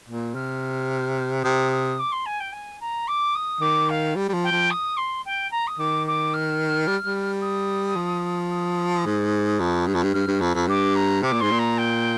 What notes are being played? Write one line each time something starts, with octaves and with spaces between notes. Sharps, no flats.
A#2
C3 F6
C3 D#6
D#6
D6
C6
G#5
G5
G#5
A#5
D6
D#6
D#3 D6
F5
G3
G3
F3
G5
F3
D#6
C6
G5
A#5
D#6
D#3 D6
D6
F6
G3
G3
D#6
F3
D#6
G#2
F2
G2
F2
G2
G2 F6
G2
F2
F2
G2 D6
A#5
C3 D6
A#2
G#2 C6
A#2
A#5
G5